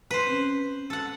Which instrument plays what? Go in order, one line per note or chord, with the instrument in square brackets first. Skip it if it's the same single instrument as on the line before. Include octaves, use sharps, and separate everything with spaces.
[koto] B4 C5
[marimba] C4 C#4
[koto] A4 F#5